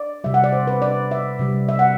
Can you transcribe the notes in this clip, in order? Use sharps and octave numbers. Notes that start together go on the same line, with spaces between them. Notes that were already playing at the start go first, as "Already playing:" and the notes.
Already playing: D5
C3 G3 E5
F#5
D5
C5
B4
D5
E5
C3 G3
E5
F#5